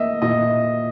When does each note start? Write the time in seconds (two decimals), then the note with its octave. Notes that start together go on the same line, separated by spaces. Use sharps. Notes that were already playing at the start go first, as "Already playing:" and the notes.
Already playing: A#3 D#5 E5
0.22 A#2 D#5